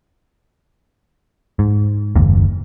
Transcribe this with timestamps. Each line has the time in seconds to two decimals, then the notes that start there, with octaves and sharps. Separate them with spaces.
1.59 G#2
2.15 F#1 D#2 G#2